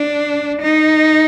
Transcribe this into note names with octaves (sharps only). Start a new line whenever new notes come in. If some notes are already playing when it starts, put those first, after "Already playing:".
Already playing: D4
D#4